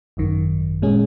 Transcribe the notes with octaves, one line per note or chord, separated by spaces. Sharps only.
G#1 F#2 D#3
A#2 G#3 C#4 G#4